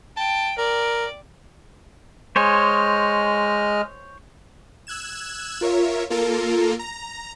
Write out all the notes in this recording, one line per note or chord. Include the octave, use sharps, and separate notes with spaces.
G5 A5
A#4 D5
G#3 C5 C#5 D#5 G#5 F6
E6 F#6 G#6 E7
F4 A#4 C#5 E5
A#3 F4 A4 A#4
A#5